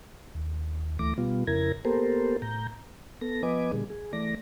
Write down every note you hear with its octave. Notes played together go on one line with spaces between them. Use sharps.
D#2
D2 E3 A3 D6 A#6
B2 G3 B3 F4
F2 C#3 E4 A#4 G#6 A#6
A#3 B3 G4 A4 A#4 C5
A2 A#5 G6
B3 A4 A#6
F3 B3 B4 D#5 G#5 D6
A#2 D3 G3 G#4
G#4
E3 A3 D5 A#6